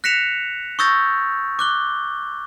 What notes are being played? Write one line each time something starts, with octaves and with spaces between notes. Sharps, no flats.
F#6 A#6 B6 C#7 E7 F7
C#6 D#6 E6 G6 A6 A#6
D6 F#6 G7